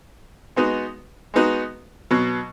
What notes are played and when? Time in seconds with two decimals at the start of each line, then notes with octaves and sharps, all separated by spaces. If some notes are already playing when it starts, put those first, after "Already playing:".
0.56 G#3 B3 D#4 F#4
1.34 G#3 B3 D#4 F#4
2.11 B2 F#3 B3